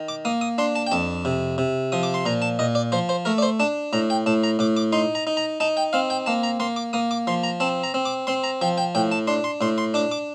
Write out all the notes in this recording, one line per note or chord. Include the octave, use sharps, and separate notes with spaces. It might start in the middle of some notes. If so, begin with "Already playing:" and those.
Already playing: D#3
D6
A#3 D#6
D#6
D4 C6
A5
G5
F2 A5
C3
C3
F3 D#6
D6
C6
A#2 A#5
A5
A#2 D#5
D5
F3 C5
C5
A3 A#4
D5
C5
D4 A5
A2 A#5
G5
A2 A5
A#5
A2 D6
D6
D#4 C6
A#5
D#4
A#5
D#4 A5
G5
C4 F5
G5
A#3 A5
A#5
A#3 C6
D6
A#3 D#6
D6
F3 C6
A#5
C4 A5
A#5
C4
D6
C4 C6
A#5
F3 G5
G5
A2 G5
A5
D4 C6
C6
A2 C6
C6
D4 D6
D6